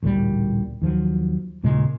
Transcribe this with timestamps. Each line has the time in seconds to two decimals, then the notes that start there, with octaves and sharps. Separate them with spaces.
0.03 A1 D2 A#2 G3
0.82 D#2 F3 F#3
1.63 D#2 A#2 C#3 G#3